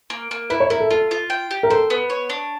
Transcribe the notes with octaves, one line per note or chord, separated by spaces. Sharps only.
A#3
A#3
E4 B4
C#5
E4 A#4
A4
F4 A4
F4
G5
G4
A#4
A4 C5
B3
C#5
D4